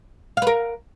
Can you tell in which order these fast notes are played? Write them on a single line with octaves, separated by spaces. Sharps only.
F5 B4 A#4